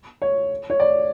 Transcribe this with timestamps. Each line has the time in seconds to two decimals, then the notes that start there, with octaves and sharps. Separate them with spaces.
0.22 C#5
0.70 C#5
0.80 D5